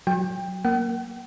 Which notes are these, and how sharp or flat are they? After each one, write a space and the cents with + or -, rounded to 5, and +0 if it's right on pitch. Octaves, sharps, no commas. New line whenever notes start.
F#3 +0 G5 +20
A#3 +0 F#5 +45